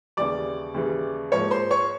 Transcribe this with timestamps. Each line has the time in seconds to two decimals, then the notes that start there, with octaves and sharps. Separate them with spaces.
0.17 D#2 C#3 E3 G3 D5 D6
0.74 D#2 C#3 E3 G3
1.32 G#2 F3 A#3 C#5 C#6
1.51 C5 C6
1.71 C#5 C#6